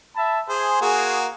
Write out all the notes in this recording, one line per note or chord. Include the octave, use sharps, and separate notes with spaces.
E5 A5 B5
G#4 C5
A#3 F#4 G#4